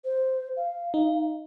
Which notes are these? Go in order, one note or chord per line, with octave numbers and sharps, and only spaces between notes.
C5
F5
D#4